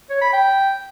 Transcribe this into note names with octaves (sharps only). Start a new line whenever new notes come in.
C#5
B5
G5